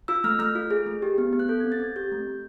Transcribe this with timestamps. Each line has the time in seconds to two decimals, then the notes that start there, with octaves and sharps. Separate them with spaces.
0.08 F4 E6
0.24 A3 F6
0.39 A3 F6
0.55 F4
0.71 G#4
0.86 A3
1.02 G4
1.18 B3
1.33 B3
1.39 F#6
1.49 A4 G6
1.60 G#6
1.64 C4
1.72 A6
1.80 C4 G#6
1.96 G4 G6
2.12 A3
2.27 A3